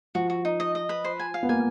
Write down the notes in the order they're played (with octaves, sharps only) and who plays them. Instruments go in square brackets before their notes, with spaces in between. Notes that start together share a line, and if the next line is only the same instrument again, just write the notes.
[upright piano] F3 [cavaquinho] F#4
[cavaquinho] F#4
D#4
D#5
D#5
B4
C5
G#5
F5
[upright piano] B3
[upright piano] A#3 [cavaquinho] G#5